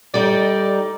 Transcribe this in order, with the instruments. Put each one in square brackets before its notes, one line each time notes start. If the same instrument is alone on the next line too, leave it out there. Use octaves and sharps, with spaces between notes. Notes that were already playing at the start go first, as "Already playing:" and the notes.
[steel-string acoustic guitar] G3 D#4 [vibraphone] A4 [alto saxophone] D5